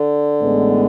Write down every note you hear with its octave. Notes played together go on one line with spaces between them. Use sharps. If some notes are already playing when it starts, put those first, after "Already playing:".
Already playing: D3
A1 A2 G#3 B3